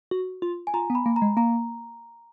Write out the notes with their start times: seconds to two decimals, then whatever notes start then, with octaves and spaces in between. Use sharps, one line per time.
0.11 F#4
0.42 F4
0.67 G#5
0.74 F4 A#5
0.90 B3
0.95 B5
1.06 A#3
1.16 A#5
1.22 G#3
1.37 A#3 A#5